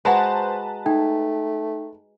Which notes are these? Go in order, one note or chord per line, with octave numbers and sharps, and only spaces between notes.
G#3 F#4 B4 C5 A5 A#5
A3 D#4 G5